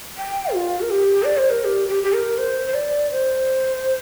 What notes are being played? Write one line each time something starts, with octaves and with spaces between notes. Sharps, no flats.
G5
F4
A#4
G4
D5
C5
A#4
G4
G4
G4
A#4
C5
C5
D5
C5